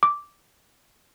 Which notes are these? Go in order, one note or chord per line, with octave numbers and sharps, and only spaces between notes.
D6